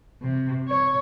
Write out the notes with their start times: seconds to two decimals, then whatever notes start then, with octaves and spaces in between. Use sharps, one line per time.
0.22 C3
0.68 C#5